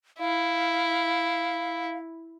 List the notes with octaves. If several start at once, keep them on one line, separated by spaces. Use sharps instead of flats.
E4 F5